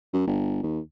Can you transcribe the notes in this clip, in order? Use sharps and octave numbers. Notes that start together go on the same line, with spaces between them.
F#2
G1
D#2